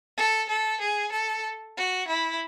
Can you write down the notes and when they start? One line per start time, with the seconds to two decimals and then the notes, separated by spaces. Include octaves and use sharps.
0.18 A4
0.50 A4
0.81 G#4
1.13 A4
1.77 F#4
2.08 E4